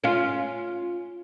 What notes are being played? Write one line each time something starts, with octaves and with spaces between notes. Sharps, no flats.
C#4 F4